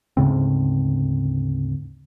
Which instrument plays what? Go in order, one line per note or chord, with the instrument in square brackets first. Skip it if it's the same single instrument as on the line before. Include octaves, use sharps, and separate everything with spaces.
[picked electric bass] D2 G#2 C#3 C4